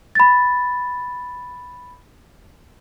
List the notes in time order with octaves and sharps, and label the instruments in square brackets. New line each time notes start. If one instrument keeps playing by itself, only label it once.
[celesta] B5 A6